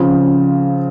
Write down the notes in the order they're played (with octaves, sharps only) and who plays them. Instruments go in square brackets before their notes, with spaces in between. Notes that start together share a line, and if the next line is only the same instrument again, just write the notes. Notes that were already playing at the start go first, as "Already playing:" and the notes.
Already playing: [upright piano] C#3 F3 C4 F4